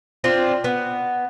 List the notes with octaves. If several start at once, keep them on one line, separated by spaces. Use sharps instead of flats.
C4 D4 F4
B3